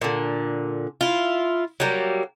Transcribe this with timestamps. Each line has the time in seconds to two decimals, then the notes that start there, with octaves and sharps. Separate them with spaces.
0.02 A#2 D3
1.01 E4 F4
1.80 F#3 G3 A#3